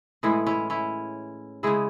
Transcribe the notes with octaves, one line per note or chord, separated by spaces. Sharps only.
A2 E3 G#3 E4 G#4
C#4 E4
C#4 E4
C#3 G#3 E4 G#4